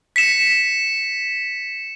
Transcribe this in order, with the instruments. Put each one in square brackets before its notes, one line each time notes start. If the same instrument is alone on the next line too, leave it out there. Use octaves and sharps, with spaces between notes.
[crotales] B6 C#7 E7